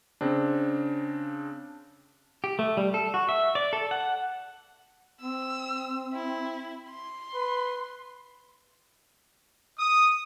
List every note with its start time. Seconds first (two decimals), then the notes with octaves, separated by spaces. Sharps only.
0.21 C#3 C4 D4
2.44 G4
2.59 A3
2.77 G3
2.94 A4
3.14 F#4
3.29 E5
3.55 D5
3.73 A4
3.91 F#5
5.21 C4 E6
6.13 E4
6.91 C6
7.34 B4
9.79 D#6